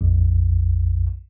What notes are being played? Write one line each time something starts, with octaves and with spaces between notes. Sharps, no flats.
A#1 F2